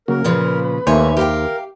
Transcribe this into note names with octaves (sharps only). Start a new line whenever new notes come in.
C#3 F#3 A#3 A#4
A#2 C#3 F3 B4
D#2 D#3 A3 A#3 C5 C#5 E5 G#5
G4 A#4 F5 G5